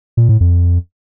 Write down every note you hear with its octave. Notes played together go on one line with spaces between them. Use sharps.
A#2
A2
F2